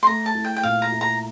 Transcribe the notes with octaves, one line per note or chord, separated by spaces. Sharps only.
C6
A3 A#5
A5
E4
G5
G5
A#2 F5
A#5
E4
A#5